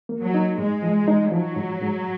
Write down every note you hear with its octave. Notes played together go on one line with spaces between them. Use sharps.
A#3
F#3
D#4
G#2 G#3
F3
D#4
F3 F#3
G#2
G#2